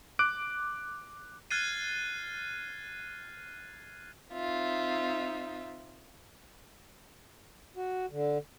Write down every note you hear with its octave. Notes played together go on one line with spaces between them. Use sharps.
D6 F#6 D7
F6 F#6 G#6 A6 C7 D#7
C4 D#4 F4 E5
F#4
D3